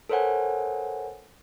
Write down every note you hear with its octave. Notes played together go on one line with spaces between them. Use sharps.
A4 A#4 C5 C#5 F#5 G#5